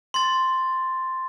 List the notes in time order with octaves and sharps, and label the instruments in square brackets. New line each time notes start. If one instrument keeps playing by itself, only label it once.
[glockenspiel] C6 A6